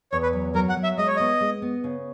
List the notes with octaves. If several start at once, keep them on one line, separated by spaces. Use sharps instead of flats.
E2 C#5
B4
F#3
F#3 A#4
F#5
F#3
E5
G#3 D#5
C#5
B3 D#5
G#3
B3
C#3